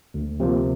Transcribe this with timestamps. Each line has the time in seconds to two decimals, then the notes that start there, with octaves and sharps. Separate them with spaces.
0.14 D2
0.40 C3 F3 A#3